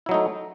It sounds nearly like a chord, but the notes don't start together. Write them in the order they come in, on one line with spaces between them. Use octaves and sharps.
E4 F#3 D#4 A3